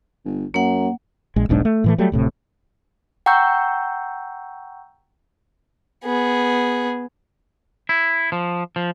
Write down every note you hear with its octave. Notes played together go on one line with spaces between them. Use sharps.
G1
F#2 A#3 F#5
A#1 G#3
E1 B1 G#2 D4
A3
A2 E3 A3
F#3 G3 A3
D1 A2 C3
F#5 G5 A#5 C#6 E6 G6
B3 G#4
E4
F3
F3